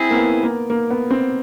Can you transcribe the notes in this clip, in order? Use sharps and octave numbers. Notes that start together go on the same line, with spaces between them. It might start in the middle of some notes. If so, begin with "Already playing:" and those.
Already playing: C4 E4 G#4
A#3
B3
A#3
A#3
B3
C4